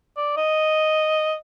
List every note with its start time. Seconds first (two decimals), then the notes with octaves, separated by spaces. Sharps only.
0.17 D5
0.37 D#5